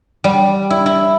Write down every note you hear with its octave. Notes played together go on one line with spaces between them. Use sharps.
G3
E4
E4